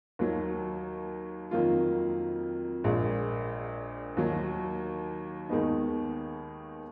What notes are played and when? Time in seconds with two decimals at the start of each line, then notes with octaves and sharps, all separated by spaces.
0.19 D#2 D#3 F#3 A#3
1.51 F2 D#3 F#3 A#3 F4
2.84 A#1 A#2 G#3
4.17 D#2 D#3 F#3
5.49 D#2 D#3 G#3 B3 D#4